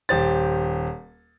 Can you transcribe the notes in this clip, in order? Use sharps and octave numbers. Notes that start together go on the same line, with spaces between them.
D#1 G4 C5 A6